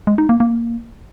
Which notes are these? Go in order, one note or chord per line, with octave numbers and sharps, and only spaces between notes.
G#3
D#4
A#3
A#3